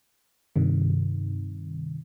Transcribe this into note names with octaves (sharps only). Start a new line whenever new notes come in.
G2 C3 D#3